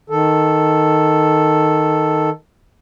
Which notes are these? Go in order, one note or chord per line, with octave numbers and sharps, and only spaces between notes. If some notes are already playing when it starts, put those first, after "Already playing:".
D#3 A4